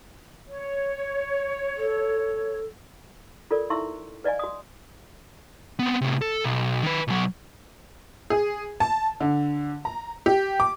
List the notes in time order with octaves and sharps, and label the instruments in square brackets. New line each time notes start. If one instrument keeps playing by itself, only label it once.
[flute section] C#5
[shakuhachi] A4
[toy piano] F4 A4 A#4 D5
D#4 E4 E5 C6 C#6 E6
B4 D5 D#5 F5 G#5
F#4 D#6
[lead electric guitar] B3 C4
A2 C3
A4
B1
D#3 B4
B1 F#3
[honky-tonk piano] G#4
A5
D3
A#5
G4
D6